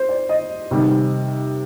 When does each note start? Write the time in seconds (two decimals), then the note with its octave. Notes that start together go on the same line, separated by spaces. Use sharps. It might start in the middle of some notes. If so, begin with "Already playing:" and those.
Already playing: C5
0.09 D5
0.29 D#5
0.71 C3 D#3 G3